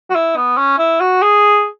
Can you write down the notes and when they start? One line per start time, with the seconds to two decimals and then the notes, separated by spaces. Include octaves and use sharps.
0.10 F#4
0.15 E4
0.36 B3
0.58 C#4
0.79 E4
1.01 F#4
1.22 G#4